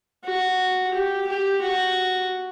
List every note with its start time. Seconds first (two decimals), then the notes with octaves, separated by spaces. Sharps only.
0.24 F#4
0.93 G4
1.27 G4
1.62 F#4